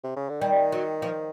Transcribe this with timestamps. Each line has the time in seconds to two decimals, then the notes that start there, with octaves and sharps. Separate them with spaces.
0.04 C3
0.17 C#3
0.29 D3
0.42 D#3 G3
0.72 F#3
1.02 F3